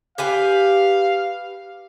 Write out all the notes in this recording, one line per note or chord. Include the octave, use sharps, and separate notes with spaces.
G4 B4 F5 G#5